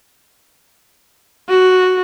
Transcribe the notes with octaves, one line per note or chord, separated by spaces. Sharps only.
F#4